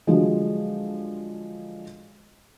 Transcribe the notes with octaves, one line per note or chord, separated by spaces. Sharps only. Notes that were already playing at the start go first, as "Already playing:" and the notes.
D3 F3 F#3 G#3